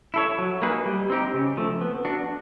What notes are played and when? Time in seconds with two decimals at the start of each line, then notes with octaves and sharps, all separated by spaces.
0.14 E4 A4 C#5
0.38 F#3
0.62 A#3 D#4 G#4 B4
0.86 G3
1.10 C4 D#4 G4
1.34 C#3
1.57 F3 A3
1.81 B3
2.05 D4 F#4